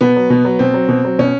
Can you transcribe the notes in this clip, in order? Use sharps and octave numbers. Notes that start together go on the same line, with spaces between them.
B2 B3
F#3
B2
F#3
B2 C4
F#3
B2
F#3
B2 C#4